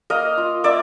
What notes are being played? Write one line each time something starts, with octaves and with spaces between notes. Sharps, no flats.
A#3 D#5 F5
F4
A#3 D5 E5